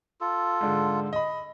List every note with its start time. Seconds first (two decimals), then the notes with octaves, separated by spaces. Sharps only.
0.21 F4 A4
0.61 G#2 D3
1.13 D#5 B5